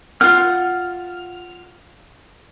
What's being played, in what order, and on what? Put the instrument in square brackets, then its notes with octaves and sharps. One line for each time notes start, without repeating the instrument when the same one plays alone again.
[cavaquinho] F4 F#5 [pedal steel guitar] F6